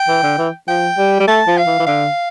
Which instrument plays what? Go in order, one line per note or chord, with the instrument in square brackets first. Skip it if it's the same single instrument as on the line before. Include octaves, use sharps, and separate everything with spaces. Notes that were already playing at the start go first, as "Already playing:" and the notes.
Already playing: [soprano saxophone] G5
[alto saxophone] E3
D3
E3
[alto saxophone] F3 [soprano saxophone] G5
[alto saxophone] G3
G3
[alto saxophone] A3 [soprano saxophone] A5
[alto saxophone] F3
[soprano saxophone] F5
[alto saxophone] E3
E3
[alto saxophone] D3 [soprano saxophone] F5